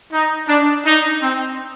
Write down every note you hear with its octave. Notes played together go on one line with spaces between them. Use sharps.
D#4
D4
D#4
C4